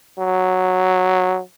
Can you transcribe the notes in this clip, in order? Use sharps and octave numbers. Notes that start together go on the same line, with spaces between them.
F#3